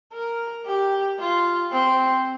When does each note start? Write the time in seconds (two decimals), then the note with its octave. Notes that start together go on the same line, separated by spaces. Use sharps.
0.13 A#4
0.65 G4
1.19 F4
1.71 C4